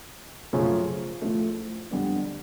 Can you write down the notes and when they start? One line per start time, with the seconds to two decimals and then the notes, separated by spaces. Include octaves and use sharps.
0.53 F#2 C#3 F3 A3 C#4
1.22 A2 F3 A3
1.91 F2 D3 G3 B3 D4